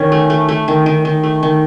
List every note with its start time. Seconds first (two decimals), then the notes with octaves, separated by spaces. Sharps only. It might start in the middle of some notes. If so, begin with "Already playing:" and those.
Already playing: D#3 C#4
0.12 A3
0.30 A3
0.49 A3
0.68 D#3
0.86 D#3
1.05 D#3
1.23 A3
1.43 D#3